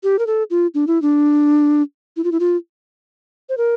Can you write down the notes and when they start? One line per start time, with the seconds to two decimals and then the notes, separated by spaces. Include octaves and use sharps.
0.03 G4
0.19 A#4
0.27 A4
0.50 F4
0.74 D4
0.87 E4
1.02 D4
2.17 E4
2.24 F4
2.32 E4
2.40 F4
3.49 C5
3.58 A#4